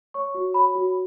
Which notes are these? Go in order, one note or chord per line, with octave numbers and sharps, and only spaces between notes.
C#5 C#6
F#4
C#5 B5
F#4